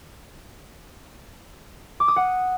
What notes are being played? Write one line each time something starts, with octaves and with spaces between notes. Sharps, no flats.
D6
D#6
F#5